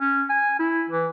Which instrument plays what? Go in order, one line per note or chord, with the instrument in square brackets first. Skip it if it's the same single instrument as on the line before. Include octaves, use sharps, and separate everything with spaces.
[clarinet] C#4
G#5
E4
E3